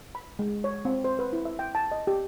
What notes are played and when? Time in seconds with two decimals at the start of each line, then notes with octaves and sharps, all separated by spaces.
0.15 B5
0.39 G#3
0.64 C#5
0.85 C4
1.04 C5
1.19 B4
1.33 E4
1.45 E5
1.59 G5
1.75 A5
1.92 D#5
2.07 G4